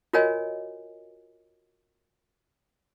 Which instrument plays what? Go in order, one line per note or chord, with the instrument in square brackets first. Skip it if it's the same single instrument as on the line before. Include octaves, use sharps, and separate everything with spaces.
[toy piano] F4 F#4 A#4 C#5 D#5 G#5